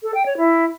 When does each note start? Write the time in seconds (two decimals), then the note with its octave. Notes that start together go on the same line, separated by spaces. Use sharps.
0.03 A4
0.14 G5
0.26 C#5
0.37 E4